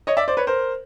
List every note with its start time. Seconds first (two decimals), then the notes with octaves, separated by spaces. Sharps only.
0.07 C#5 D#5
0.17 D5 E5
0.28 C5 D5
0.37 B4 C#5
0.47 A#4 C5